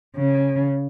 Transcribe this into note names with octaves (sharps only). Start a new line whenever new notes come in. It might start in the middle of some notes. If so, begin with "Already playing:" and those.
C#3